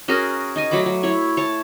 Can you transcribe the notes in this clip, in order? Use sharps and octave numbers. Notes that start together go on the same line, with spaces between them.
C#4 F#4 G#4 A#4
D#4 D#5 G#5
F#3 A3 B5 D6
F#3
E4 C#5
C#5 A5